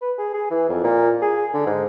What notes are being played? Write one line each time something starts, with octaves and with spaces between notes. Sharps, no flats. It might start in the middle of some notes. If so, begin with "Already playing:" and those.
B4
G#4
G#4
E3
F2
A#2
G#4
D3
G#2